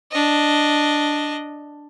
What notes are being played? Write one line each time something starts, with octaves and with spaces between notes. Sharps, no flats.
D4 D#5